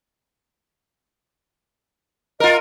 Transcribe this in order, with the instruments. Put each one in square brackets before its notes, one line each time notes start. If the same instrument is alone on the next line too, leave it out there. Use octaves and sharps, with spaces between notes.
[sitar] F4 A#4 [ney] D#5